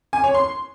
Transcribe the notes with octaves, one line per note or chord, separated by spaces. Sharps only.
G#5
C#5
C6